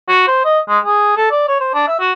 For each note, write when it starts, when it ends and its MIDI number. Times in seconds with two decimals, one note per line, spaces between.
0.08 0.23 66
0.27 0.44 72
0.44 0.59 75
0.69 0.78 56
0.84 1.15 68
1.16 1.28 69
1.31 1.44 74
1.48 1.56 73
1.60 1.72 72
1.74 1.84 62
1.88 1.96 76
2.00 2.12 66